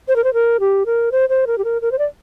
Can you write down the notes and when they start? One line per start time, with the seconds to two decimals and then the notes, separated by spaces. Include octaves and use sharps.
0.08 C5
0.16 A#4
0.24 C5
0.34 A#4
0.60 G4
0.86 A#4
1.12 C5
1.29 C5
1.47 A#4
1.58 G4
1.64 A#4
1.82 A#4
1.91 C5
1.98 D5